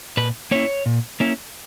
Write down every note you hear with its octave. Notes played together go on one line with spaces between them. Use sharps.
A#2 B4
A#3 C#4 E4 C#5
A#2
A#3 C#4 E4